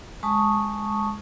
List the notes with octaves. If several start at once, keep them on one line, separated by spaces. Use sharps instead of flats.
G#3 A5 C#6 D#6